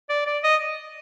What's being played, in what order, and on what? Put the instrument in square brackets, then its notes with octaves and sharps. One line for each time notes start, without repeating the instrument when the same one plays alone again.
[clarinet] D5
D5
D#5